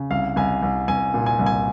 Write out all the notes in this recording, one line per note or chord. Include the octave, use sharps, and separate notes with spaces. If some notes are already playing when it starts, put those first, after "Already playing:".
Already playing: C#3
C2 F5
C2 G#5
C2
C2 G#5
A#2
G#5
C2
G#5